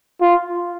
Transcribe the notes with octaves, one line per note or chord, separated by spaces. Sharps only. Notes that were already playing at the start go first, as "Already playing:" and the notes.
F4